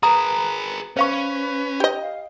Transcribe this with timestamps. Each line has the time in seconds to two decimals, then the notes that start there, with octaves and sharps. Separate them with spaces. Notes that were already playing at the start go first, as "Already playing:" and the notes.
0.03 G#4 A#4 B4 A#5 D#6
0.97 C#4 B4 C5 F5 C#6
1.80 G4 D#5
2.01 F5